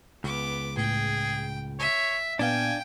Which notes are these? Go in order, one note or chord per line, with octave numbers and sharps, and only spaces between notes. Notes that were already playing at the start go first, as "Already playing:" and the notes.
C#2 B3 D6
A2 G#4 G5
C#5 E5
A#2 B3 D4 F5 G5 G#5